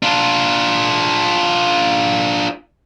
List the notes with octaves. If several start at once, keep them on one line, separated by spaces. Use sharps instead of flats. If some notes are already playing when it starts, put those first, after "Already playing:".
D4 F4